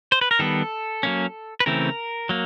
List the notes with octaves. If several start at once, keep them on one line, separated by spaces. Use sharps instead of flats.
C5
B4
A#4
D#3 G3 B3 A4
F#3 A#3 C#4
B4
C#3 E3 A3 C4 A#4
F#3 A#3